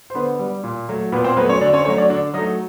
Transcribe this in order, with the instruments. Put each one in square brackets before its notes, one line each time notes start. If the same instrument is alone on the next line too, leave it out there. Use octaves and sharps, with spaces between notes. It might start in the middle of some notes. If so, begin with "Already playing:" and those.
[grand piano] C5
D3 B3 B4
G3
A#2
F#3 A3
A#2 B3 B4
C4 C5
F#3 B3 B4
A3
C#4 C#5
D3 D4 D5
C#4 C#5
F#3 A3 C#4 C#5
D4 D5
D3 D4 D5
F#3 D#4 D#5
A3